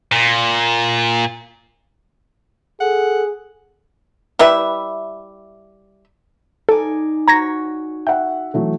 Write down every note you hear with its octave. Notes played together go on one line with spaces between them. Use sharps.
A#2
G#4 A4 F#5
G3 E4 B4 E5
D#4 A4 D5 G#5
F#4 C#5 A#5 G#6 A#6
E5 F#5 G5
E3 F#3 A3